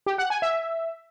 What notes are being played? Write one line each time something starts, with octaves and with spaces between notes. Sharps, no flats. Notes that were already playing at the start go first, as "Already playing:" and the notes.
G4
F#5
G#5
E5